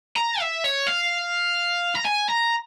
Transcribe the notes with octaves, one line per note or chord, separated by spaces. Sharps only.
A#5
E5
C#5
F5
A#5
G#5
A#5